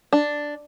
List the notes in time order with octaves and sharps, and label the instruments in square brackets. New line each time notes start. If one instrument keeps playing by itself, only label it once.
[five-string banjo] D4